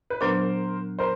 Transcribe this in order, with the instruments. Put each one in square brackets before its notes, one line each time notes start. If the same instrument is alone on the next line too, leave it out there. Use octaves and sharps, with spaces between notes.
[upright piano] B4
[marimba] A#2 F#3 B3 D4 [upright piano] A#4 C5
[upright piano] A#4 C5